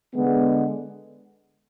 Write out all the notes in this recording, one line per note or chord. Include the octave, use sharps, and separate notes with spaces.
D3 G#3 B3